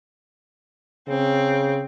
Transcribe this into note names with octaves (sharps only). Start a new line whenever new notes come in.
C#3 C4